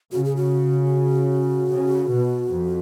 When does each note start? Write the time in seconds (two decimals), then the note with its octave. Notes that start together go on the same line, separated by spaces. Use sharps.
0.12 C#3 F#4
0.25 G#4
0.36 F#4
1.71 C#3
2.11 B2
2.50 F2